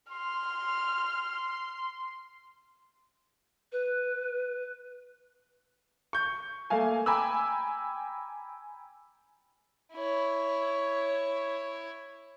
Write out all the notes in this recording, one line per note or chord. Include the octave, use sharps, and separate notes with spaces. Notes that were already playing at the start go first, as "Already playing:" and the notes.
C6 F6
B4
C#6 G6
A3 A#3 F5 G#5
G5 G#5 A#5 B5 D6 E6
E4 C#5